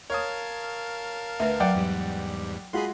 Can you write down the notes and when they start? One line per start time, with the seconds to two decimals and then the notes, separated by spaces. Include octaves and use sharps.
0.10 A#4 C#5 F5 A5 D#6
1.40 D2 B4 E5
1.60 F#3 D5 F#5 G5
1.74 E2 G#2 G3
2.73 G#3 F4 F#4 G#4 B5 C6